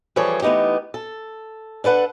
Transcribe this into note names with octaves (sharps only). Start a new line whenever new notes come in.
E3 F3 G3 G#4 A4 C#5
E3 A3 B3 D#4 G4
A4
D4 A4 B4 F#5